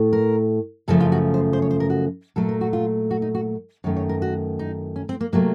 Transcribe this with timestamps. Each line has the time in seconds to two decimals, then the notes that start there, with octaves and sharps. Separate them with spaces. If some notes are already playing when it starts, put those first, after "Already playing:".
Already playing: A2 A3
0.13 A#4
0.88 F#2 C#3 F3 A3 A4
1.00 F4
1.12 F#4
1.34 C5
1.53 C5
1.62 C#5
1.71 C5
1.80 A#4
1.90 F#4
2.36 A#2 F#3 A3 A4
2.49 A#4
2.61 F#4
2.73 F4
3.11 F#4
3.22 D#4
3.35 F#4
3.84 F#2 D#3 A3 C#5
3.96 C#5
4.09 A#4
4.22 F#4
4.59 D#4
4.96 C#4
5.09 C4
5.21 A#3
5.33 C3 F#3 A3 A#3